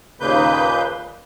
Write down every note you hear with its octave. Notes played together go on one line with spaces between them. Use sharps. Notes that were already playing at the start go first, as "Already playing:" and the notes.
D#2 A#2 C#3 A#3 B4 G6